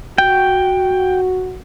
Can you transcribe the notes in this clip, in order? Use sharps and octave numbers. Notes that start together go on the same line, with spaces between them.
F#4 G5